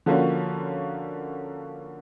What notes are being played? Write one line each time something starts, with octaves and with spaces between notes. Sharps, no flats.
D3 F3 A#3 C#4 F#4